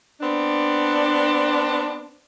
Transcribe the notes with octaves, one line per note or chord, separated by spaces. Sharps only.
B3 C4 D4